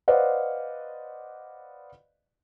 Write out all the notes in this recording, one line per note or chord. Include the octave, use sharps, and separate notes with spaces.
B4 C5 D5 D#5 F5 F#5